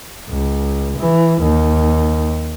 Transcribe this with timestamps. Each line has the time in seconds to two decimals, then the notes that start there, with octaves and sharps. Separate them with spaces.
0.29 C#2
0.99 E3
1.42 D#2